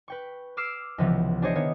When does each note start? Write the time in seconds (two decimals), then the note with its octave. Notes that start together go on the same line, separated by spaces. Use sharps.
0.08 B4 G5 C#6
0.57 D6 E6 F6 C7 D7 E7
0.98 C#2 C3 E3 F3 B3
1.42 D4 G4 G#4 C5 C#5 D#5
1.55 D#3 B3 C#5